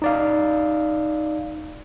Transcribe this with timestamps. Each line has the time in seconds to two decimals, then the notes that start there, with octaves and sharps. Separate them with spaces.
0.02 D#4 D5 F5